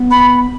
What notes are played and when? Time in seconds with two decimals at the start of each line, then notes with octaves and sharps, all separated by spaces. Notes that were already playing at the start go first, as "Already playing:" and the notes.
Already playing: B3
0.11 B5